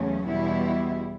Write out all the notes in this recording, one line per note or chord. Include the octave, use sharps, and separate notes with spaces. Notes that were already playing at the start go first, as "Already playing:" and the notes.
Already playing: E2 C#3 F#3 A3 C#4
E2 B2 G3 B3 E4